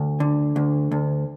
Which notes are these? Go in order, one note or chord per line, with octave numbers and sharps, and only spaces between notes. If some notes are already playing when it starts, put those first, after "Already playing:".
Already playing: D2
D3
D2
D2